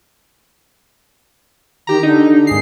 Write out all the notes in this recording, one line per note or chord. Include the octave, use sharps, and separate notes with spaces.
D#3 G4 A#5
D3 D#4
G#1 G#4 C7